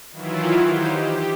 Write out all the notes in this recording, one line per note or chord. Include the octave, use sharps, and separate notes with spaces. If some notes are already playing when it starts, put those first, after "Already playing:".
D#3 E3 F#3 E4 F4
D#4 G4 C5
G4